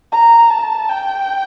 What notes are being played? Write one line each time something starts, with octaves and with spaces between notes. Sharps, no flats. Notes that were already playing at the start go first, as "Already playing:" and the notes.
A#5
A5
G5